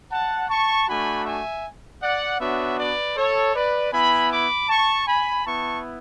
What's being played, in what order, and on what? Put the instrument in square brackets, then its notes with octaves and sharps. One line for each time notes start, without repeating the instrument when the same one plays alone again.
[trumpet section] F#5 A5
A5 C#6
A3 D4 F#4 G#5 B5
E5 G#5
D5 F#5
B3 D4 F#4 C#5 E5
B4 D5
A4 C#5
B4 D5
B3 E4 G#5 B5
B5 D6
A5 C#6
G#5 B5
B3 E4 A5 C#6